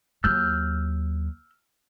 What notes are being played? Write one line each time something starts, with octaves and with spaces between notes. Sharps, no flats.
D#2 F#3 E6 F6 G6